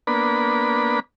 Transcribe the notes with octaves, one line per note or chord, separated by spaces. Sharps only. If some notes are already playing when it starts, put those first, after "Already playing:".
A#3 B3 D4 B5